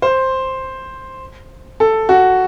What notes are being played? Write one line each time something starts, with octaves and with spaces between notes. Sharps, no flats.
C5
A4
F#4